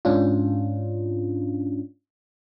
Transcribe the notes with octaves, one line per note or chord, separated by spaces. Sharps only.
G#2 C#4 D4 F4